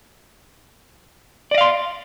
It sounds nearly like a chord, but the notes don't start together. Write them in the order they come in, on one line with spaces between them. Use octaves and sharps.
D5 D#5 F5 C6